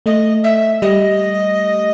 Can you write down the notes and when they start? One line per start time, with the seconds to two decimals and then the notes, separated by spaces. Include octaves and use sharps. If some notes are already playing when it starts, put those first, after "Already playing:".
0.06 A3 D#5
0.44 E5
0.82 G3 D#5